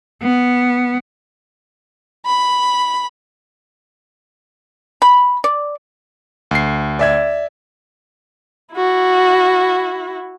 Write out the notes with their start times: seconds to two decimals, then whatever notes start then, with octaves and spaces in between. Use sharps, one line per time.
0.23 B3
2.26 B5
5.02 B5
5.44 D5
6.51 D2 C7
6.99 D5 E5 G#6
8.74 E4 F#4